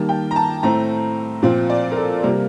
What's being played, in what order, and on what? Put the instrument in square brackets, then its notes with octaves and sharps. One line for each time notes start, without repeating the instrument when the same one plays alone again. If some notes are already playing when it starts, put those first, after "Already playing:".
Already playing: [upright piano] D#3 G3 A#3 A5
G5
A#5
A5
A2 A3 C4 A#5
A#2 F3 C4
D5
A#4
A4
C3 G3 A#3 A#4